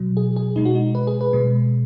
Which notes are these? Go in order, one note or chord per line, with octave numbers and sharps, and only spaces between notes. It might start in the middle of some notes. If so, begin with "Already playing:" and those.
Already playing: B2 F#3
G#4
G#4
B2 G#3 D#4
F#4
D#4
B4
G#4
B4
B2 G#3